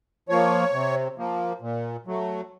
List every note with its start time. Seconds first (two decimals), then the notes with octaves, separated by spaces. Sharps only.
0.29 F3 A#3 C#5
0.73 C3
1.17 F3 A#3
1.61 A#2
2.07 F#3 A3